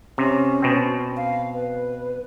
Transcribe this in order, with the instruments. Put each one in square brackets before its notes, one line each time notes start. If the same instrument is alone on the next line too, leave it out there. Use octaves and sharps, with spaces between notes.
[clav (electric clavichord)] C3 [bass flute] C#4
[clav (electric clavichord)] B2 C4
[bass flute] F5
B4